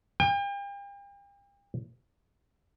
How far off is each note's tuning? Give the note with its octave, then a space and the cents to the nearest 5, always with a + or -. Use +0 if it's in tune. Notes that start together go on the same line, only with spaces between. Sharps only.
G5 +40